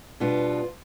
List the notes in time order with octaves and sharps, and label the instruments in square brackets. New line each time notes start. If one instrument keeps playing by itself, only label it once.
[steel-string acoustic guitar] B2 G3 B3 D4 F4